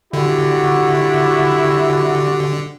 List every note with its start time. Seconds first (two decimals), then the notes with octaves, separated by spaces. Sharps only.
0.13 D3 E4 F#4 G4 D5